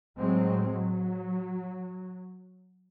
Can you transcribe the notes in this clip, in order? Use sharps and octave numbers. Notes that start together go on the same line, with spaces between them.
A2 F#3 G#3 C4
F#3